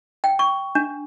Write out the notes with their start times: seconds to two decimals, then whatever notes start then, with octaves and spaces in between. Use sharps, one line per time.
0.24 G5
0.39 C#6
0.75 D4